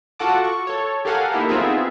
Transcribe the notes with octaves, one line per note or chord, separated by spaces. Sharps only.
F4 F#4 A4 F#5 A5 D6
C#6
A4 C#5
G4 A4 A#4 F5 F#5 G#5
A#3 D#4 E4 G4 A4 A#4
B3 C4 D#4 F4 G#4 E5